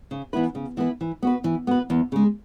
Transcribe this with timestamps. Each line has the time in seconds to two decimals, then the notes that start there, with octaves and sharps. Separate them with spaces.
0.11 C#3
0.33 E3 B3 E4 B4
0.55 C#3
0.77 E3 B3 E4 B4
1.01 E3
1.22 B3 F#4 B4
1.44 E3
1.67 B3 F#4 B4
1.90 E2
2.12 C#3 G#3